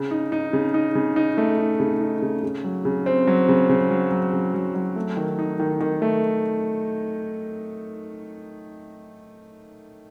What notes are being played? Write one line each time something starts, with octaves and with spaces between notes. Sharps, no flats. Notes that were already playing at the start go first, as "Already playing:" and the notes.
Already playing: C#3
D#4
D#4
C#3
D#4
C#3
D#4
A3
D#4
C#3
D#4
C#3
C#3
F#3
C#3
C4
F#3
C#3
C#3
F#3
F#3
C#3
F#3
F#3
A3
D#3
D#4
D#3
D#3
A3